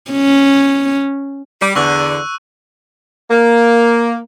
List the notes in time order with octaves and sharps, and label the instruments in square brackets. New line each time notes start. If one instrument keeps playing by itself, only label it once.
[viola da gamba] C#4
[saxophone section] G3
[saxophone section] E2 D3 [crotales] C#6 E6 F#6
[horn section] A#3